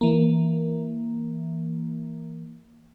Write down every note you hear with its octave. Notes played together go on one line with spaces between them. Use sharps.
E3 A#3